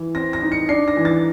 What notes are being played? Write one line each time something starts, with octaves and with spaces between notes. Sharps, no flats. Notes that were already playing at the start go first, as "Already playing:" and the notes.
Already playing: E3
C4 A#6
A#6
D#4
C#7
D4 C7
A#6
E3
A6